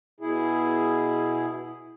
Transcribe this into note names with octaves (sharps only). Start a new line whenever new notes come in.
B2 E4 G#4